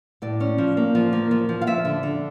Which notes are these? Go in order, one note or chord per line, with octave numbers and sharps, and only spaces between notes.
A2 D5
C#4
F3
A#3
F3
A#3
F3
F3
F5
F3 E5
D3
D3